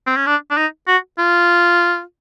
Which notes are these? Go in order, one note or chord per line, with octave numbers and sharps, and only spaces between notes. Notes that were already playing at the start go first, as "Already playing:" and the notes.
C4
C#4
D4
D4
D#4
F#4
F4